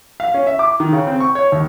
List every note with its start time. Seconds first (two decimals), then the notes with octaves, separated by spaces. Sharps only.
0.20 F5
0.34 C#4
0.47 E5
0.59 D6
0.80 D#3
0.92 C#3
1.07 C4
1.20 C#6
1.35 C#5
1.52 D#2